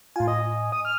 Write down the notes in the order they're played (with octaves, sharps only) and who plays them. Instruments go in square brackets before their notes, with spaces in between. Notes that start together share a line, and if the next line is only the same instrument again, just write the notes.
[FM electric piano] A2 G#5 [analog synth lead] F4
[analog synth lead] D#5
D#6
F6